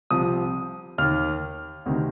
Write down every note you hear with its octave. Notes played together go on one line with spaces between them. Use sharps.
C2 C3 F3 D#6
D#2 D#3 F6
D2 C3 D#3